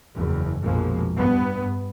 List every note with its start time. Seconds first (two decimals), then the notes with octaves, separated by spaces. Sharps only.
0.17 F#1 E2
0.62 A#1 F2 B2 F3 G#3 A#3
1.18 G2 B3